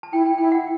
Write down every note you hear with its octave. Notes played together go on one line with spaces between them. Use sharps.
A5
E4 G5
G5
E4 G5
F#5